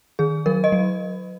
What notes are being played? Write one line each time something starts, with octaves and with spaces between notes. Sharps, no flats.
D#3 G#4
F#3 A#4
D#5
F#3